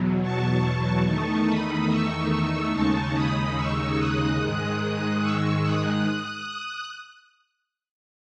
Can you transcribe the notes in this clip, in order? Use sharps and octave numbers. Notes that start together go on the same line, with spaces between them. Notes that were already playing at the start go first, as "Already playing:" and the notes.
Already playing: E2 B2 F#3
A5 C#6
E2 D#3 A3 D#4 A5 C#6
B5 D#6
C#6 E6
C#6 E6
D#2 C#3 G#3 D#4 A5 C#6
B5 D#6
C#6 E6
D#6 F#6
G#2 D#3 G#3
C#6 E6
D#6 F#6